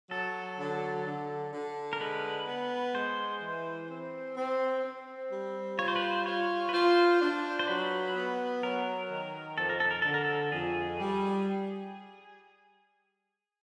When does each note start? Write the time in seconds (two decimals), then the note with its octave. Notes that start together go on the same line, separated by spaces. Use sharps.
0.11 F#3 A4
0.58 D3
1.06 D3
1.53 D3
1.93 A#4
2.01 G#3 B4
2.48 B3
2.95 G#3 C5
3.42 E3
3.89 C4
4.37 C4
4.84 C4
5.32 G3
5.79 F4 C#5
5.88 C5
5.96 B4
6.04 C5
6.26 F4 C#5
6.69 B4
6.73 F4 C5
7.21 D4
7.59 C5
7.68 F#3 B4
8.16 B3
8.63 F#3 A#4
9.10 D#3
9.58 F2 A4
9.69 A#4
9.80 A4
9.91 A#4
10.02 D3 A4
10.14 A#4
10.25 A4
10.52 F2 G#4
10.99 G3